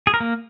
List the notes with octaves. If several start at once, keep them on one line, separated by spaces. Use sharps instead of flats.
G#4
A#4
A#3